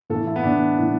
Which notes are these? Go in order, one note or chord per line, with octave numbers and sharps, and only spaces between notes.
A2 E3 A4
E4
B3
A2 E3 D4
A2 E3